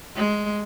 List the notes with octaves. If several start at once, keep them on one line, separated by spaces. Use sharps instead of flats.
G#3